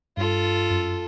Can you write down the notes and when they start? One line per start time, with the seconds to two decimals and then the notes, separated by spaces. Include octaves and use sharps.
0.17 G2 F4 A4
0.70 F#2